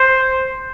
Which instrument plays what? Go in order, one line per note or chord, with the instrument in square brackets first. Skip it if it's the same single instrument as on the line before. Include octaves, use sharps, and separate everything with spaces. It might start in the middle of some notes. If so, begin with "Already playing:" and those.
Already playing: [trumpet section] C5